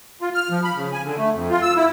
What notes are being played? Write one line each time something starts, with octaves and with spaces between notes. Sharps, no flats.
F4
F6
F3
B5
C#3
G#5
D3
A3
F2
F4
E6
E4